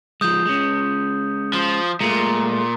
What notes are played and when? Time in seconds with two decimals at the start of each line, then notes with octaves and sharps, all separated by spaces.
0.21 F3 G#3 D#6 G6
0.45 G#3 C#4
1.53 F3
2.01 A#2 G#3 A3